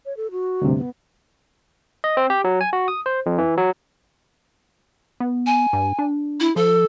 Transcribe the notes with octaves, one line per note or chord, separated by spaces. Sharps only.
C#5
A4
F#4
D2 G2 C3
B3
D#5
C4
G4
F#3
G#5
F#4
D#6
C5
F2
E3
F#3
B3
G#5
G2
D4
E4
F3 A4